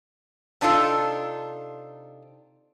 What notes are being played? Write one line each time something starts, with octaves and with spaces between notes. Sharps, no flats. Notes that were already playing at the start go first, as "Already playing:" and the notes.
C3 D4 D#4 F4 A4